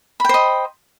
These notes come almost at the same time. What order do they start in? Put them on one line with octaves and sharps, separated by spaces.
B5 G5 C5 D#5